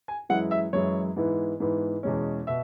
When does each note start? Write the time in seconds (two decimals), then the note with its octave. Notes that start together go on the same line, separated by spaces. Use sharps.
0.08 G#5
0.29 F#2 E3 G#3 E4 F#5
0.51 E5
0.73 F#2 E3 G#3 E4 C#5
1.16 G#2 E3 B3 E4
1.60 G#2 E3 B3 E4
2.03 E2 B2 G#3 C#4
2.47 B2 E5